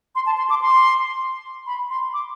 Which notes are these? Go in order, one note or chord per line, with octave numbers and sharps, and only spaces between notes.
C6
A5
C6
D6
C6
B5
C6
D6